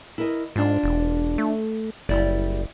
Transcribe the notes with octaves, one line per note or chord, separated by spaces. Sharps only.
E4 A#4 D#5
G#2 D4 F4
E1
A3
F#1 G3 E4 D5